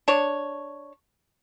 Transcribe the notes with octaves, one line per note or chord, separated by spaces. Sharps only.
D4 C#5